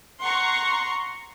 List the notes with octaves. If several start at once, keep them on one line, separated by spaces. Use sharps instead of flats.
F#5 A#5 C6 C#6